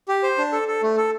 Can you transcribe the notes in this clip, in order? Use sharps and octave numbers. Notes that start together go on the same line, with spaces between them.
G4
C5
D4
A4
A4
A3
A4